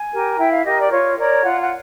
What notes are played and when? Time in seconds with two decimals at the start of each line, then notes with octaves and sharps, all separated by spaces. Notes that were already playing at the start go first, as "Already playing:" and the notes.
Already playing: G#5
0.12 G4 A#4
0.38 E4 G5
0.51 F5
0.65 G4 A#4 D#5
0.79 D5
0.91 F4 C#5
1.17 A#4 C#5 D5
1.44 F4 F#5
1.61 F#5